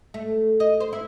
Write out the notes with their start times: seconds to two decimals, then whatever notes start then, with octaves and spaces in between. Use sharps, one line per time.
0.14 A3
0.60 D#5
0.80 C5
0.93 E4